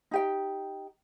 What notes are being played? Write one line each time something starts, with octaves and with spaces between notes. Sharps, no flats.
D#4 G4 G5